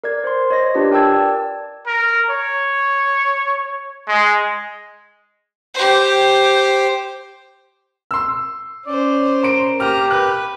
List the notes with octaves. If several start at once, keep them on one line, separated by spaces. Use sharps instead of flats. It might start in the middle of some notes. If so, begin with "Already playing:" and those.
A#4 D5 G#6
C5 C6
C#5 D#5 A#6
D4 F4 G4 B4 D5
A#4 G5 A5 E6 G#6
D5
A#4
C#5
G#3
G4 C5
C6 E6
C#4 C5 D5
A#4 C6 D7
A#3 G4 A#5 F6
B4 F#6